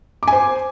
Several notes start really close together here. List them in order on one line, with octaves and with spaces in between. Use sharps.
D6 G#5 C5